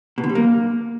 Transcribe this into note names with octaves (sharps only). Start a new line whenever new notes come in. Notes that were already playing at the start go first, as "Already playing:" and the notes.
B2
D3
G3
A#3